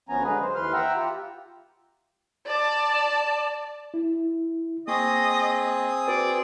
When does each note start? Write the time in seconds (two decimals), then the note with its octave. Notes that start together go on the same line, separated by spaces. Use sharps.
0.09 D2 F3 B3 C#4 G#5 A#5
0.23 D3 F#3 G#3 G#4 B4
0.42 C5
0.55 D#2 E3 B4 C6 F6
0.73 E5 F#5 G5 A#5 E6
0.96 F4 G4
2.47 D5 A5
3.94 E4
4.88 A#3 C4 G#4 D#5 C#6 D#6
6.08 F#4 B4 D5